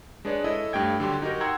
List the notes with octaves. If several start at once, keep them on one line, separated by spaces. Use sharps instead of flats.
G#3 D4 G#4 B4 C#5 D5
E4 A4 C#5 D#5
G2 A3 G4 G5 G#6
D3 F#3 G4 G5 C6
D#4 F#4 G4 A#4
F#5 G5 A#5 C6 E6 G#6